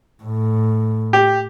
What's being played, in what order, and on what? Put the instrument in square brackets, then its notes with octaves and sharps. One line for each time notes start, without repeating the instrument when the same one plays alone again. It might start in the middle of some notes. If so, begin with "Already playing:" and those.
[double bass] A2
[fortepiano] G4